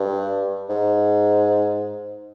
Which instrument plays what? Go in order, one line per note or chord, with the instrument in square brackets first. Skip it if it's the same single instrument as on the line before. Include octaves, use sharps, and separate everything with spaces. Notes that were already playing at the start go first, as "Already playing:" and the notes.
Already playing: [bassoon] G2
G#2